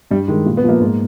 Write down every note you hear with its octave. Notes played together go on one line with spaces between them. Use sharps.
G2 G3
D#3 G#3
A#2
B3
F3 A#3
G#2